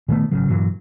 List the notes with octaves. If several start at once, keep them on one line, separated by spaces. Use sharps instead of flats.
A#2 D#3 A3 B3
G#1 C#3 F#3
G2 A#2 E3 F#3